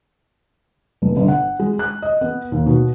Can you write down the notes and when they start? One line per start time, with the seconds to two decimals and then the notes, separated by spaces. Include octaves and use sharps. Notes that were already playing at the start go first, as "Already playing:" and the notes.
1.02 F1
1.17 G1
1.28 F#5
1.59 G#3
1.79 F#6
2.02 D#5
2.21 B3
2.52 D#2
2.66 B2